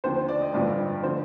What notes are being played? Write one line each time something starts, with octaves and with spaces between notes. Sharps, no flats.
D#2 D3 F3 C5
C5
D5
D#5
A1 G2 D3 F3 D5
D3 F3 C5